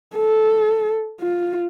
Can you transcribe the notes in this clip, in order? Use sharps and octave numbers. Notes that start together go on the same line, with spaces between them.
A4
F4